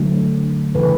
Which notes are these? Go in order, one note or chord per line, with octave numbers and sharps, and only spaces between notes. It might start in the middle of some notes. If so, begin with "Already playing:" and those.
Already playing: D3 F#3 A3
C#3 E3 A3 A4 B4